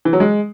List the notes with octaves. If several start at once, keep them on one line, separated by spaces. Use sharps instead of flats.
E3
F#3
G#3